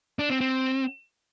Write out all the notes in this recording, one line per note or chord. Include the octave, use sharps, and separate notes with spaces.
D4
C4
C4